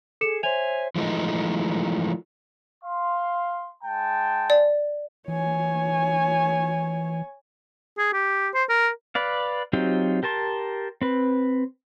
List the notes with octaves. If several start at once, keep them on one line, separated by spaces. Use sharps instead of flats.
G#4 A4 C#7 E7
C5 C#5 E5 G#5 F7
E3 F3 G#3 A3 D#4
F5 C6
G#3 G5 A5
D5
E3 C#5 G#5
G#4
G4
C5
A#4
B4 D5 F5
F#3 C4 D#4 F4 G4
G4 A#4 A5 C6
C4 B4